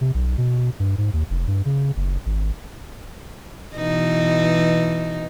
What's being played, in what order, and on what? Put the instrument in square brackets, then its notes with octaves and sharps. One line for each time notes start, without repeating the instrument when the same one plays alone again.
[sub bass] C3
B1
B2
G2
G#2
D#2
F1
G2
C#3
F#1
G#1
[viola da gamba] B2 E3 D#4